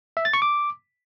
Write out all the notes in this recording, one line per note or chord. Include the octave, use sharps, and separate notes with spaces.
E5
A6
C#6
D6